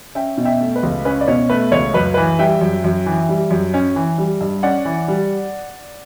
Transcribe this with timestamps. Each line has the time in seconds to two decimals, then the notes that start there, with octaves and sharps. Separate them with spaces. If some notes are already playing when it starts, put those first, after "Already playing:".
0.15 C#4 E5 G5
0.37 B2
0.45 E5 G5
0.61 A3
0.76 B4
0.83 C#2
1.05 C#4 B4
1.21 D5
1.28 B2 C#5
1.49 A3 B4
1.72 C#2 C#5
1.94 F#2 B4
2.14 E3 B4
2.39 G3 E5 G5
2.61 F#2
2.84 F#2
3.06 E3
3.29 G3
3.50 F#2
3.74 C#4
3.96 E3
4.18 G3
4.41 G2
4.63 C#4 D5 F#5
4.85 E3
5.08 G3